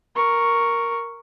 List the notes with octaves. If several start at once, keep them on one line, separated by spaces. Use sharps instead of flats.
A#4 C#6